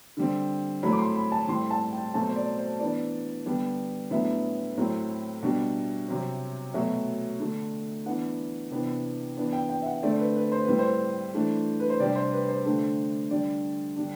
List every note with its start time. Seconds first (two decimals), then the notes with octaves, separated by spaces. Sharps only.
0.17 D3 G3 C4
0.83 A2 F#3 A3 C4 B5
0.92 D6
0.99 C6
1.16 B5
1.32 A5
1.48 A2 G3 C4 C6
1.71 A5
1.93 G5
2.14 B2 F#3 A3 C4 A5
2.29 C5
2.36 D5
2.58 C5
2.79 E3 B3 D4 D5
3.46 D3 G3 B3 D4
4.11 A2 F#3 B3 D4 E5
4.78 A2 F#3 C4
5.43 B2 G3 D4
6.08 C3 F#3 C4
6.74 B2 F#3 A3 E5
7.39 D3 A3 D4
8.05 E3 B3 D4 F#5
8.71 C3 E3 B3 D4
9.37 E3 B3 D4
9.53 G5
9.69 G5
9.82 E5
9.86 F#5
10.03 D3 A3 C4 D5
10.19 B4
10.36 B4
10.52 C5
10.65 A2 G3 C4 B4
10.79 C5
11.34 E3 A3 D4
11.80 B4
11.90 C5
12.00 C3 G3 D4 D5
12.16 C5
12.32 B4
12.49 C5
12.65 D3 A3 D4
13.31 D3 G3 D4 D5
13.96 D3 G3 D4